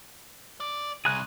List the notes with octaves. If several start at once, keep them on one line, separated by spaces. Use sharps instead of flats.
D5
C2 G#4 A#5 F#6